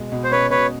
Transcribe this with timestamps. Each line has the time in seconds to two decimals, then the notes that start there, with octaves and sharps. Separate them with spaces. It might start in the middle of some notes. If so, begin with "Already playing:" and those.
Already playing: B2 G#3
0.12 B2
0.24 C5
0.31 C#4 B4 C#5
0.50 B2 B4 C#5